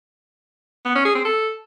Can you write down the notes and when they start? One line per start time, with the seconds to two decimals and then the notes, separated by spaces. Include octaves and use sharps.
0.85 B3
0.95 C#4
1.05 G#4
1.15 C4
1.25 A4